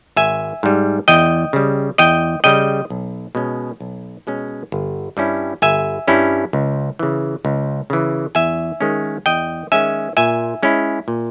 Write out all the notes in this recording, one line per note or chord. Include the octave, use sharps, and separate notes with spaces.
G#1 E5 G#5
G#2 G3
E2 D#5 G5
C#3 G3
E2 D#5 G5
C#3 G3 D#5 G5
B1
B2 G#3 C#4
B1
B2 G#3 C#4
G1
G2 G3 C#4 E4
G1 E5 G#5
G2 G3 C#4 E4
C#2
C#3 E3
C#2
C#3 E3
E2 E5 G#5
D#3 G#3 C#4
E2 D#5 G5
D#3 G#3 C#4 E5 G#5
A#2 E5 G#5
G#3 C#4 E4
A#2